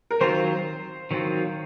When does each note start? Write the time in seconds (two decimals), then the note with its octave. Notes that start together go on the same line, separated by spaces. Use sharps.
0.11 A#4
0.21 D#3 F#3 C4 F4 C5
1.11 D#3 F#3 C4 F4